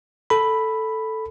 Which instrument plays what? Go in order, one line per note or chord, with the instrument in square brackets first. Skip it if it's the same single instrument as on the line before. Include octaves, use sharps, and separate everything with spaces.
[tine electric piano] A4 B5